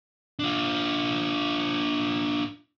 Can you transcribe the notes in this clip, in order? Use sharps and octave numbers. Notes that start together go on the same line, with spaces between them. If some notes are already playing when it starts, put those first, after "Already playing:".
D4 F4